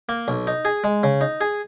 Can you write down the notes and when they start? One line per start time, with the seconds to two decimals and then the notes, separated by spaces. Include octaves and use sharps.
0.09 A#3
0.28 B1
0.47 D#4
0.65 G#4
0.84 G#3
1.03 C#3
1.21 D#4
1.41 G#4